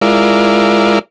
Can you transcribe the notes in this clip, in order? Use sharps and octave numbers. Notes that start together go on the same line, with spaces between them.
G#3 E4 F4 A#4 D5